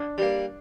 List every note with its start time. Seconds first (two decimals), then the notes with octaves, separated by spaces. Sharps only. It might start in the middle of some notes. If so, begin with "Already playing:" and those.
Already playing: D4
0.18 G3 A#3